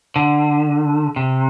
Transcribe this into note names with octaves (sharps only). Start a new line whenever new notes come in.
D3
C3